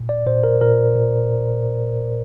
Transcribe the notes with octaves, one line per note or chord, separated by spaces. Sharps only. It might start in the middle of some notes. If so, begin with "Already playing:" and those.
Already playing: A#2
D5
A#2 C5
A#4
A#2 A#4
A#2